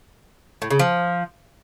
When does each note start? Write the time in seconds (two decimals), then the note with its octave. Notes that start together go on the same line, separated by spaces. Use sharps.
0.62 A2
0.71 C#3
0.79 F3